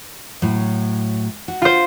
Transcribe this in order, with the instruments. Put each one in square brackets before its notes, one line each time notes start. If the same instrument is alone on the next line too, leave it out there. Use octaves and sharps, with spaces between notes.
[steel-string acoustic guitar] A2 F#3
F#4
[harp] F4 C5